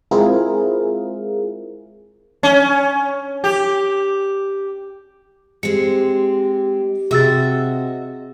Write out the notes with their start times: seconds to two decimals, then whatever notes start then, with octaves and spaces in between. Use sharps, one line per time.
0.11 G#3 C4 E4 F4 G#4 A#4
2.43 C#4
3.44 G4
5.63 G#3 C4 G4 C#7
7.11 C3 F#4 G#4 D#5 E5 E6 A6